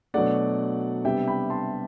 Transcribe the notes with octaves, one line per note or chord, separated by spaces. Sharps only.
B2 F#3 A3 D4 D5 F#5
C3 G3 B3 D4 E5 G5
G5 B5
A5 C6